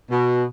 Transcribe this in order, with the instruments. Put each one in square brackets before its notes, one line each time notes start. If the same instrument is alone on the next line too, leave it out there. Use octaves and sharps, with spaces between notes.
[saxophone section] B2